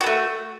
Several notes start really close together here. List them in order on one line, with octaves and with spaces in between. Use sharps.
F#4 B3 A3